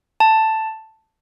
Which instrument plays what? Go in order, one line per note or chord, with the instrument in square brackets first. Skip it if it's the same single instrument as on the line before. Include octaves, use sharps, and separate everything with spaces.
[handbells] A5